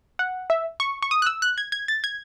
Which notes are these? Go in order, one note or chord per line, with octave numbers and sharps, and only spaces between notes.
F#5
E5
C#6
C#6
D#6
F#6
E6
F#6
G#6
G#6
A6
G#6